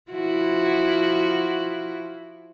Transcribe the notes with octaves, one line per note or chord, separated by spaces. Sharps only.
F3 E4 F#4